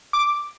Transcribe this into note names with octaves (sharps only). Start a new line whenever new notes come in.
D6